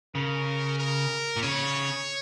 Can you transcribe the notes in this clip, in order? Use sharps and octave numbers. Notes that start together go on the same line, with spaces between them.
C#3 A#4
A#4
A#2
C#3 C#5